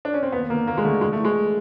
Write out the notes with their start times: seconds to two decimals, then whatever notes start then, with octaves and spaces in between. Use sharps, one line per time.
0.05 D4
0.14 C#4
0.23 C4
0.32 D#2 B3
0.50 D3 A#3
0.67 D#2 A#3
0.77 G#3
0.84 D3 A3
1.01 G2 G#3
1.13 A3
1.19 E3
1.25 G#3